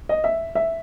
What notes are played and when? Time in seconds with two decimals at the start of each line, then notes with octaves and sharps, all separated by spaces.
0.09 D#5
0.24 E5
0.55 E5